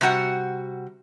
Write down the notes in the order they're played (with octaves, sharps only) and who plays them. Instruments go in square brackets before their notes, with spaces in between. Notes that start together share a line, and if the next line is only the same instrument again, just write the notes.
[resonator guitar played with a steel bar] C3 G3 F#4 F#5